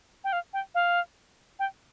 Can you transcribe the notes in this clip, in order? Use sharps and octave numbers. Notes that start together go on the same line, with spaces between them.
G5
F5
G5
F5
G5